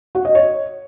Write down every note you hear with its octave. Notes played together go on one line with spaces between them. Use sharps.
F#4
D#5
C#5